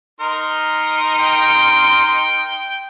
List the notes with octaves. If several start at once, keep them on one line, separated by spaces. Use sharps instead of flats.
D#4 A#4 C6
G5